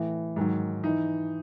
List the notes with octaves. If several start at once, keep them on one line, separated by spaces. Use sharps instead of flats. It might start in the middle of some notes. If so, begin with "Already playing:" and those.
Already playing: A2 E3
G#2 D#3 F#3
E3 D#4